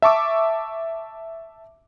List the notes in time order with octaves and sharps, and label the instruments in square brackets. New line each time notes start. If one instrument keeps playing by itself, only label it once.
[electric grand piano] E5 A5 C#6 D6 E6